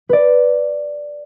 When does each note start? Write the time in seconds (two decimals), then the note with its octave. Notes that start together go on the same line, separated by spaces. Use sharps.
0.09 B4 D5